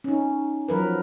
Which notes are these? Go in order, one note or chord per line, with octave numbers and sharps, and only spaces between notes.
C#4 D#4
F3 F#3 A#4 B4